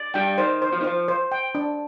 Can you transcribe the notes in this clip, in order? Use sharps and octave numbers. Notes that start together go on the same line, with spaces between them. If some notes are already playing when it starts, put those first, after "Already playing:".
Already playing: D5
G2 G3 G5
D#3 C5
C5
F3
D#3
F3 C5
C5
G5
D4